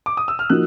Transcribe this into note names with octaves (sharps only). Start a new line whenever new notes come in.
D6
D#6
E6
F6
F3 A#3 D#4 F#4 F#6